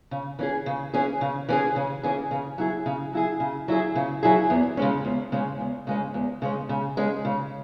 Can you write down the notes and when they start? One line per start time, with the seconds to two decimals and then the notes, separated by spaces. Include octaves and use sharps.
0.11 C#3
0.39 E3 C#4 G#4
0.66 C#3
0.94 E3 C#4 G#4
1.21 C#3
1.49 E3 C#4 G#4
1.76 C#3
2.03 E3 C#4 G#4
2.31 C#3
2.58 F#3 E4 G#4
2.86 C#3
3.13 F#3 E4 G#4
3.40 C#3
3.68 F#3 E4 G#4
3.96 C#3
4.23 F#3 E4 G#4
4.50 E2
4.77 C#3 G#3 C#4
5.05 E2
5.32 C#3 G#3 C#4
5.60 E2
5.87 C#3 G#3 C#4
6.14 E2
6.42 C#3 G#3 C#4
6.69 C#3
6.97 G#3 C#4
7.25 C#3